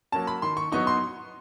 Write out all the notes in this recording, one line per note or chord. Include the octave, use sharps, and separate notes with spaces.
F#3 A#3 C#4 A5
B5
D#3 C6
C#6
F#3 B3 D#4 C#6
C6